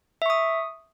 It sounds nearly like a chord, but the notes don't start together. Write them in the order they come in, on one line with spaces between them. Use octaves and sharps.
E5 C#6 D#6